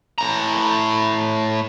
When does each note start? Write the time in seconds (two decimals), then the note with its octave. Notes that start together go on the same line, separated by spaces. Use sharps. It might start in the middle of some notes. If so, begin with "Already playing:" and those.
0.18 A2 A#5